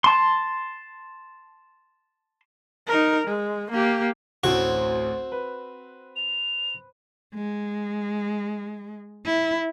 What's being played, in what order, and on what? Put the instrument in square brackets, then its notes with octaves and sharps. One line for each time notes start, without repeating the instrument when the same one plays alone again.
[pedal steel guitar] A5 C6
[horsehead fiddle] D#4 A#4
G#3
A#3 G4
[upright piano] A1 D2 [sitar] C4 [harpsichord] F#4
[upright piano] B4
[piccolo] F7
[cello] G#3
E4